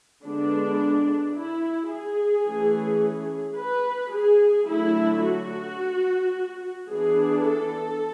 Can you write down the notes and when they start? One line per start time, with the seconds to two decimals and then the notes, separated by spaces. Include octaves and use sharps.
0.24 D3 G#3 B3 D4
1.35 E4
1.90 G#4
2.46 E3 A3 C#4
3.57 B4
4.12 G#4
4.68 D3 F#3 A3 E4
5.24 F#4
6.91 E3 B3 D4 G#4
7.46 A4